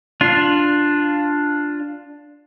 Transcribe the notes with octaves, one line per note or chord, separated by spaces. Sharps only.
D4 F4